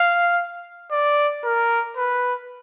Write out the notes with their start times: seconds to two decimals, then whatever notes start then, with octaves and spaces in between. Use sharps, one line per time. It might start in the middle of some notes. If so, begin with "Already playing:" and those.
Already playing: F5
0.91 D5
1.44 A#4
1.97 B4